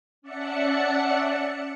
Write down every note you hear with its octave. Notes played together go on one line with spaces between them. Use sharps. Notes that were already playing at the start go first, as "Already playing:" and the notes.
C#4 D5 E5 F#5 A5 C#7